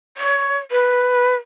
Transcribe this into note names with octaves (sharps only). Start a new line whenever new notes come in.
C#5
B4